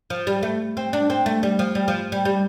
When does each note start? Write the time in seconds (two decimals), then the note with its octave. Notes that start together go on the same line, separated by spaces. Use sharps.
0.10 F3
0.27 G3
0.43 A3
0.77 C4
0.93 D4
1.10 C4
1.26 A3
1.43 G3
1.59 F3
1.75 G3
1.88 F3
2.12 G3
2.25 G3